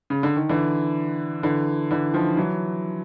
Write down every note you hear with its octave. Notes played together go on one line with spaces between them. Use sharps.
C#3
D3
D#3
D3 E3
D3 E3
D3 E3
D#3 F3
E3 F#3